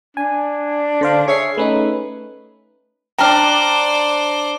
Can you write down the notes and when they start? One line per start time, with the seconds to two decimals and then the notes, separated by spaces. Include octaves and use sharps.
0.17 D4 G#5
1.01 D3 C5 F5
1.28 G#4 C#5 E5 C7
1.58 A3 C#4 D#4 B4
3.19 D4 C5 D5 G5 A5 A#5 F6